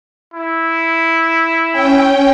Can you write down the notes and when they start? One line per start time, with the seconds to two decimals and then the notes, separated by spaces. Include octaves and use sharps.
0.34 E4
1.72 C#4 G5